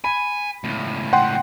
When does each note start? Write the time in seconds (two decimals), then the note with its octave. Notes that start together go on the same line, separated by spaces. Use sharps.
0.04 G#5 B5
0.64 C#2 A2
1.13 F#5 G5 C6